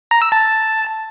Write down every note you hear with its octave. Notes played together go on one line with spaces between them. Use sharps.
A#5
E6
A5